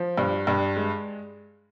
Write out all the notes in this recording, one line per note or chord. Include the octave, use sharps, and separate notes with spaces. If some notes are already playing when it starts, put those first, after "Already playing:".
Already playing: F3
G2
G2
G#3